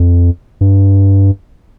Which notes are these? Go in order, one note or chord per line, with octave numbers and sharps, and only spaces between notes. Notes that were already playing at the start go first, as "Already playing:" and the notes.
Already playing: F2
G2